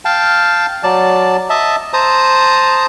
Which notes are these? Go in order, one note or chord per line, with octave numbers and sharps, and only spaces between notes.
F5 G5 A5
F#3 D5 A5
D#5 E5 A5
C5 A5 A#5 D#6